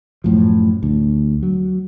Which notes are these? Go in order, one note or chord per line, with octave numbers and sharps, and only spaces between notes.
F#2 A2 F3
D2
F#3